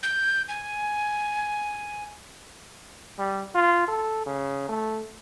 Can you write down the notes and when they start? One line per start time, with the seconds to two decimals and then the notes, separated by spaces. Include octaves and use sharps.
0.03 G6
0.48 G#5
3.19 G3
3.55 F4
3.88 A4
4.26 C#3
4.69 A3